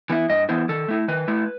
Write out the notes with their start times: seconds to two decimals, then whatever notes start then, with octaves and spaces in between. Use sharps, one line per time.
0.10 E3 B3 E4
0.29 G2 D#5
0.49 E3 B3 E4 C5
0.69 D#3 A4
0.88 A3 E4
1.08 D#3 B4
1.28 A3 E4